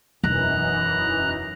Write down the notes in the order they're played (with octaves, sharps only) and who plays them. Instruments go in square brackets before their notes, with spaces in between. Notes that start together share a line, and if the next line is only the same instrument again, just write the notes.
[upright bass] E1 [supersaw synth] F#2 E3 D#4 [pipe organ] A#5 F#6